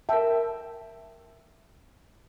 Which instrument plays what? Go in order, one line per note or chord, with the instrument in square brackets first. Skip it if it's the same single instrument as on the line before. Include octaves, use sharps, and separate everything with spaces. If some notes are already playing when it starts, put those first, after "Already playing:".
[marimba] A#4 A5 [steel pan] E5 G5